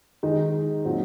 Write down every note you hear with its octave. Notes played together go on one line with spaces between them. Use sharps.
D#3 G#3 D#4
A#2 F#3 C4 D#4